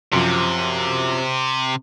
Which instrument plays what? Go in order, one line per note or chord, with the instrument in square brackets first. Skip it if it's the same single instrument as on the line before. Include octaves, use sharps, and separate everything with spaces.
[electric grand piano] F#2 F3 [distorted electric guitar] C3